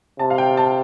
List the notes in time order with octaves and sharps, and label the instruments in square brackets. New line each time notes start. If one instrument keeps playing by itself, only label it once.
[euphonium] C3 [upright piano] A5
[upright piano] F5
G5
A5